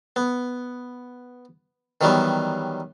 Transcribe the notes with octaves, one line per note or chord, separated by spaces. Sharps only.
B3
D#3 E3 F#3 G3 B3